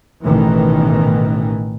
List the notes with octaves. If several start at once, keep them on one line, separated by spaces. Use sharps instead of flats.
A1 B2 D#3 E3